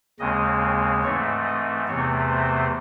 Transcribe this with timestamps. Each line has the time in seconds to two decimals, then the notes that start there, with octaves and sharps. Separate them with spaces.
0.19 D#2 C#3 G#3 C4 D#5
1.03 G#2 E3 A3 C4 C#5
1.45 D#5
1.88 E2 C3 E3 A3 C4 C#5
2.29 C5